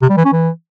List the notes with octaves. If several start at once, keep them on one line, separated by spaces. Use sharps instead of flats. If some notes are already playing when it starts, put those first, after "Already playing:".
C3
G3
E3
C#4
E3